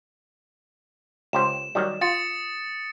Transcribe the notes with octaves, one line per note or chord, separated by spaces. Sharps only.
C#2 G4 C5 E7
D#3 F#3 G3
F4 D#6 A6 C#7